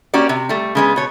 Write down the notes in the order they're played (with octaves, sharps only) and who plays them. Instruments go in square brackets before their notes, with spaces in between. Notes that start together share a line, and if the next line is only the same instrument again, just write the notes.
[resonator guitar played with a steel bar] A#3 C#4 F#4 G4 D5
C3
G3 A3
C#3 G#3 B3
B2 C#5